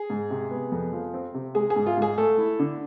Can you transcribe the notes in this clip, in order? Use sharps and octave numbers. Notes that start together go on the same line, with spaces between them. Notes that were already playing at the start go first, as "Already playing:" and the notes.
Already playing: G#4
G#2
C3
B3
F2
F3
C4
C3
G#3 G#4
G#4
G#2
F4
G#2 G#4
A3 A4
E4
D3